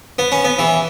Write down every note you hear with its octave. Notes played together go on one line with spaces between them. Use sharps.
B3
C#4
B3
E3